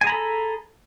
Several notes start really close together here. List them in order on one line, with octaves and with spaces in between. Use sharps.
G#5 G#4 A#5 B5 A4